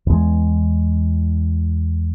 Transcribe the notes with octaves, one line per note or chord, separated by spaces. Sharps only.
E2 G#3